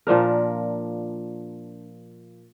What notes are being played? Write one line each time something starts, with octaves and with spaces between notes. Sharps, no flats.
A#2 F3 D4 A#4